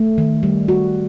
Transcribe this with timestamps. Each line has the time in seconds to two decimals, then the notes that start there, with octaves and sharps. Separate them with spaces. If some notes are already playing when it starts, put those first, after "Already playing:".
Already playing: A3
0.18 D#3
0.43 G3
0.68 F#4